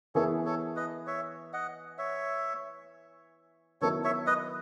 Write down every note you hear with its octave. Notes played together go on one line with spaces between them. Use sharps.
E3 B3 E4 G#4 A4 C#5
A4 C#5
B4 D#5
C#5 E5
D#5 F#5
C#5 E5
D#3 F#3 B3 E4 A4 C#5
C#5 E5
B4 D#5